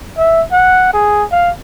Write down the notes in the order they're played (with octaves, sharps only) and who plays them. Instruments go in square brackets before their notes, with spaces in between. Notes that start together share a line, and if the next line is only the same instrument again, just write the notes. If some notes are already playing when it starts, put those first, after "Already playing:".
[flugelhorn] E5
F#5
G#4
F5